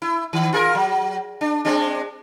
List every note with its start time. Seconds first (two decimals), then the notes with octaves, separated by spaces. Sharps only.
0.02 E4
0.33 D#3
0.53 F4 G#4 A#4
0.75 F#3
1.41 D4
1.65 G#3 C4 D4